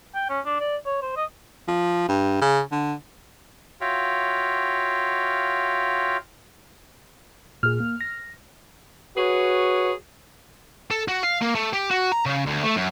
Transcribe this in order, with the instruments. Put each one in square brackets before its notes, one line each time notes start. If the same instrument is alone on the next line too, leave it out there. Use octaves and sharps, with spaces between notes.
[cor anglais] G5
C#4
D4
D5
C#5
C5
D#5
[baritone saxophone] F3
G2
C#3
D3
[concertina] F4 F#4 C#5 E5 F5 G5
[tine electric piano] A#2 G#4 [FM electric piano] F6
[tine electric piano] A#3
A#6
[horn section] F#4 G#4 B4 C#5
[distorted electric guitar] A4
F#4
F5
A#3
A3
G4
F#4
A#5
C#3
D2
A3
F#2